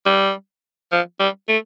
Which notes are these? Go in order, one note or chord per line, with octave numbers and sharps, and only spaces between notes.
G3
F3
G3
A3